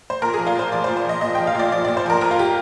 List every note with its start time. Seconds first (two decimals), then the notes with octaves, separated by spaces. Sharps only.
0.10 C5
0.22 A#2 A#4
0.34 G#4
0.38 F3
0.46 F4
0.55 A#2 C5
0.72 F3 D5
0.84 C5
0.88 A#2
0.97 C5
1.05 F3 D#5
1.21 A#2 D#5
1.35 F3 G5
1.47 F5
1.55 A#2 D5
1.72 F3 D5
1.85 A#2 D5
1.97 C5
2.06 F3 A#4
2.21 F2 A#4
2.31 F4
2.39 G4